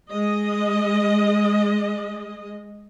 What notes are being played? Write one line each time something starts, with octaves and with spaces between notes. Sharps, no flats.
G#3 D#5